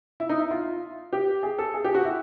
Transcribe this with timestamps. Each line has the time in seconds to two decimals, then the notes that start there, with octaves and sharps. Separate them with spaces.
0.20 E4
0.29 D#4
0.39 E4
0.51 F4
1.13 G4
1.43 G#4
1.58 A4
1.74 G#4
1.84 G4
1.95 F#4
2.05 E4